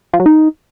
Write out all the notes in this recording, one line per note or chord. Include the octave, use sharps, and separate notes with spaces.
F3
F#3
D#4